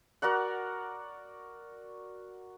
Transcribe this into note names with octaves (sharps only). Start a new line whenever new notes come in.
F#4 A#4 D5 F#5